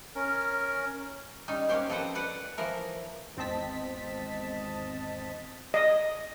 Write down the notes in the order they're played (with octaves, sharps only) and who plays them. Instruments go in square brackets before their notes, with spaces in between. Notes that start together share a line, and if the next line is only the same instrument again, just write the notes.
[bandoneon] C#4 A#4
[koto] G3 C#4 D#4
A#3 C#4 F#4 G4 C5
F3 C4 A4 B4 F#5 G5
B4 D5 F#5
E3 F3 E4 A#4
[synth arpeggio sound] G#1 E2 C4 D#5 A5 B6
[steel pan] D#5